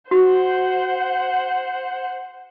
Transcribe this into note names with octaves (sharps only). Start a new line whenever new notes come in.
F#4 C5 F#5